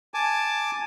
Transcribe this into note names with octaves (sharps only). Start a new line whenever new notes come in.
G#5 A5 D6